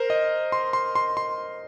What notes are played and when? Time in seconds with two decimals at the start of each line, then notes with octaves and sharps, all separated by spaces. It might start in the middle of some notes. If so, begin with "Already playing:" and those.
Already playing: A#4 C5
0.10 D#5
0.52 C6
0.73 C6
0.95 C6
1.17 C6